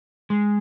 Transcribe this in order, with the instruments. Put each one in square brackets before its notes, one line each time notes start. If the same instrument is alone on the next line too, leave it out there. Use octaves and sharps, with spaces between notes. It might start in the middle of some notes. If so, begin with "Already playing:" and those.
[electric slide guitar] G#3